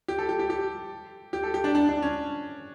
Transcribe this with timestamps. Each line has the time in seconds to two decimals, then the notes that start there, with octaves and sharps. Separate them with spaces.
0.08 G4
0.19 A4
0.29 G4
0.39 G4
0.50 G4
1.33 G4
1.44 A4
1.54 G4
1.64 D4
1.75 D4
1.89 D4
2.02 C#4